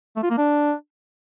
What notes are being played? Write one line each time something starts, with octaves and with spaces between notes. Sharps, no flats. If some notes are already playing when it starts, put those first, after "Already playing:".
A3
F4
A#3
D4